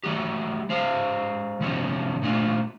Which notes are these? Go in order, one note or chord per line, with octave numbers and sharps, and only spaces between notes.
F#3 A3 F#4 G4
G#3 C5 F5
C3 F3 F#3 B3 C#4
A#2 A3 D4 F4